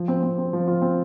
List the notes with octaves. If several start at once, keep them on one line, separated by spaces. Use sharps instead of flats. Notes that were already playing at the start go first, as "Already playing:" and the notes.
Already playing: F3
C4
C4
C4
F3
F4
C4